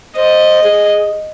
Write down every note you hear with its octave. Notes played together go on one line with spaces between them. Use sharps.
C5 D#5
G#4